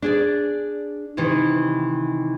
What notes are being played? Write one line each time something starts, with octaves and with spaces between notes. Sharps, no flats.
D4 G#4 D5
C3 D#3 E3 D#4